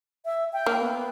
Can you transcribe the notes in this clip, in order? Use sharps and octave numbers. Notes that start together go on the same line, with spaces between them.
E5
G5
A#3
B3